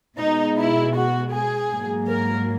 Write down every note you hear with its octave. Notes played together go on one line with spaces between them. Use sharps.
B2 G#3 D#4
E4
F#4
G#4
G#2 F#3 A#3
A#4